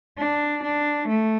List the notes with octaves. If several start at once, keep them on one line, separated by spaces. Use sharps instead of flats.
D4
D4
A3